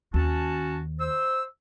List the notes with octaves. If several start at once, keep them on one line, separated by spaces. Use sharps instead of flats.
D#2 C#4 F#4 A5
C5 E6